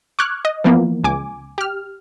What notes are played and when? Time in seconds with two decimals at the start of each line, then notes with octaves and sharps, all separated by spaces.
0.19 C#6 D6 F6 F#6 G#6
0.45 D#5
0.64 E3 F3 A#3 B3
1.04 C#2 G#5 D6
1.58 G4 F6